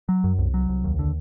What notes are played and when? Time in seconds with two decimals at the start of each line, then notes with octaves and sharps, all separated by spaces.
0.09 F#3
0.24 F#2
0.39 C2
0.54 F#3
0.69 C2
0.84 D#2
0.99 D3